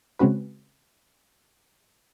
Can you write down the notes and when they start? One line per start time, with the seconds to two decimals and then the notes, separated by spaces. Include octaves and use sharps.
0.19 C#3 G#3 C4 C#4 F#4 B4